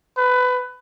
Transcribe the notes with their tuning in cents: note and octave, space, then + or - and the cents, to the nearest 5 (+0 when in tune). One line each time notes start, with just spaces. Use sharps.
B4 +20